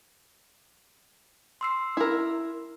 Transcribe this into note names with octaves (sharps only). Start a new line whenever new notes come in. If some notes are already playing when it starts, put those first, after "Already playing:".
C6 E6 C7
E4 A#4